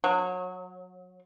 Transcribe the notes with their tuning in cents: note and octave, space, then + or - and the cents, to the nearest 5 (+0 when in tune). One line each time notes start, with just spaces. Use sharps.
F#3 -25